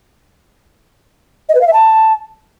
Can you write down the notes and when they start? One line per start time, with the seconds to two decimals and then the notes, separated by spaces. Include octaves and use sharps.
1.49 D#5
1.55 B4
1.61 F5
1.67 E5
1.73 A5